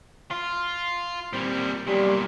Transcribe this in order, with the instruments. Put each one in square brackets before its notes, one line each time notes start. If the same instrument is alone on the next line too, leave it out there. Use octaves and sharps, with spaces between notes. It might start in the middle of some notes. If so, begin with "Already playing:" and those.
[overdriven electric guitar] F4
[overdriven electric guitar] A#2 G3 [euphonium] C4
[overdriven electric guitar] B1 A#2 [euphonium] G3